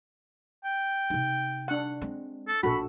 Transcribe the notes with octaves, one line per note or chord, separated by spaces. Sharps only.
G5
C3 D#4
D4 F#5
G#3 C4
A4
A#1 A#2 F#4 A4 B5